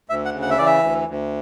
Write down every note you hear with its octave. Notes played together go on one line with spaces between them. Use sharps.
D2 E5
F#5
C#3
F#5
E5
E3 D5
E5
D2
D2